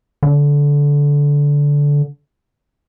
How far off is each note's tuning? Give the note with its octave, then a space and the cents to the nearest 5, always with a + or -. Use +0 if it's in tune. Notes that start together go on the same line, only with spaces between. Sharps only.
D3 -20